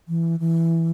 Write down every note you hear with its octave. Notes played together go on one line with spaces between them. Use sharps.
E3
E3